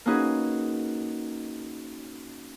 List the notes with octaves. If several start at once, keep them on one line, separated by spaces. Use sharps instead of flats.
A#3 C#4 D#4 F#4 G#4 B4